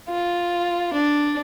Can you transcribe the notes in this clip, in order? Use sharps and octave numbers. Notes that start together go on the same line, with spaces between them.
F4
D4